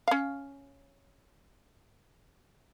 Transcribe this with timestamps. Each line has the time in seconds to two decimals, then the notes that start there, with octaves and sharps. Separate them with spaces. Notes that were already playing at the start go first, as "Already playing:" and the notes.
0.08 C#4 F5